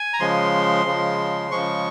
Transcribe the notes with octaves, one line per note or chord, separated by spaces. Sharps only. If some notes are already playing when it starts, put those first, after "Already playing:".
Already playing: G#5
A#5
C#3 F3 G#3 C6
C#3 F3 G#3
C#3 F3 G#3 C#6